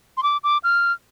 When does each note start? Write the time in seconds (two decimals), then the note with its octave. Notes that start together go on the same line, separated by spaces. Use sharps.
0.17 C6
0.23 D6
0.44 D6
0.64 F6